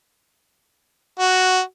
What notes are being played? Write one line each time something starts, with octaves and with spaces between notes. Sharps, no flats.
F#4